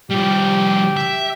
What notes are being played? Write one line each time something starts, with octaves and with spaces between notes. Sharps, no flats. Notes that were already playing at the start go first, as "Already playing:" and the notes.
F3 G3 G4
E5